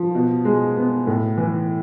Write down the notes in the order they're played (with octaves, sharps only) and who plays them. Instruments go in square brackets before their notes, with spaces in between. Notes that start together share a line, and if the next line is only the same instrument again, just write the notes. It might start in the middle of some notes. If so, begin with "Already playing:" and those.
Already playing: [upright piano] F3
B2
G#3
B3
A2
E3